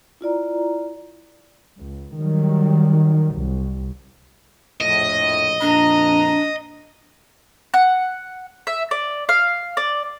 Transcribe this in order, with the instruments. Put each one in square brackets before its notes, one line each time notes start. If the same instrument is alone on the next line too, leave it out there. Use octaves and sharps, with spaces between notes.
[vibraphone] E4 F4 D5 A#5
[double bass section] C#2
D#3 F#3 G3
C2
[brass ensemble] A#1 F2 A2 [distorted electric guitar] D#5
[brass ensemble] F2 A#2 A#5 [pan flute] D4
[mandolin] F#5
E5
D5
F5
D5